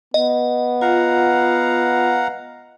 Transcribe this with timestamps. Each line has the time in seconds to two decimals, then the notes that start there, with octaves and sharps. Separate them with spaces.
0.14 B3 D#5
0.81 F4 F5 F#5 A#5